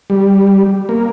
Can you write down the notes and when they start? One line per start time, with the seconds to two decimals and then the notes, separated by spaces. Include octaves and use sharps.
0.10 G3
0.89 A#3